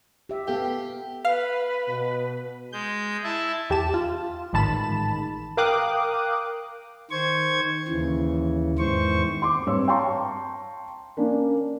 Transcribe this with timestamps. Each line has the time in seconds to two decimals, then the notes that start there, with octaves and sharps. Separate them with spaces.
0.29 G4 E5
0.47 B3 G4 A4 F5
1.25 B4 F5
1.89 B2
2.72 G#3 G6
3.24 E4 E5 A5
3.70 E2 G4 A5 E7
3.94 F4
4.53 A1 G#2 D#3 A5 B5 E7
5.57 A#4 F5 G5 D6 D#6 F#6
7.11 D#3 C5 C#6 G#6
7.88 D#2 C#3 E3
8.79 E2 G#2 D#3 E3 C5 C#6
9.42 C6 D6
9.66 G2 C4 C#5 E6
9.87 F5 G5 A5 A#5 C6 C#6
11.17 A#3 C#4 D4